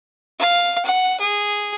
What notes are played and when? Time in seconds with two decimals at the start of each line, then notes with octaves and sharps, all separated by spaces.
0.40 F5
0.85 F#5
1.20 G#4